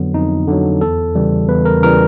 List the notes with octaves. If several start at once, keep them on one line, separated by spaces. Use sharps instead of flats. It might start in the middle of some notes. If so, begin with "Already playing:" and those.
Already playing: F2 D3 F#3 B3
F2 D#4
D3 F#3
E2 A4
C#3 E3 G3
E2 B4
A#4
C#3 E3 G3 A#4